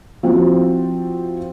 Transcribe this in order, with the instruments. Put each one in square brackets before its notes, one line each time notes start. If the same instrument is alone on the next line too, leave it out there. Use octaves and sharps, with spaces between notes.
[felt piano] F3 C4 E4 F#4